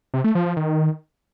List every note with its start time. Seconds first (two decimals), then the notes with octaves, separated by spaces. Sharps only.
0.14 C3
0.24 A3
0.35 F3
0.46 F3
0.57 D#3